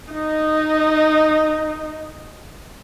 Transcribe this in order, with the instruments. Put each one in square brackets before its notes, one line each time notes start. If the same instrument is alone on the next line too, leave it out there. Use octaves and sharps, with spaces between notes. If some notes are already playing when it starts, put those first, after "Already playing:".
[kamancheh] D#4 D#5